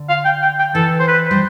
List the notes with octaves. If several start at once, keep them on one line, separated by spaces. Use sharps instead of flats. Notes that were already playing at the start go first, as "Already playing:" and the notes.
Already playing: D3
F5
G5
G5
G5
E3 A4
C5
B4
G3 C5